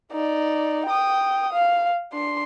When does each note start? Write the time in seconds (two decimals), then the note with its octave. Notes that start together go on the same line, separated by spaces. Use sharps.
0.12 D#4 D5
0.86 G5 D#6
1.53 F5
2.13 D4 C6